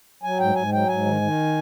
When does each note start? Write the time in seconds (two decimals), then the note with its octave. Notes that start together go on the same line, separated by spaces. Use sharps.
0.23 F#3 G#5
0.39 G#2 G5
0.55 G#2 G#5
0.72 F#3 G5
0.88 G#2 G#5
1.05 D#3
1.21 D#3